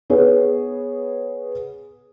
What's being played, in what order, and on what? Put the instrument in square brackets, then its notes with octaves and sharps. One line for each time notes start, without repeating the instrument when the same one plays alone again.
[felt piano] B3 G#4 B4 C#5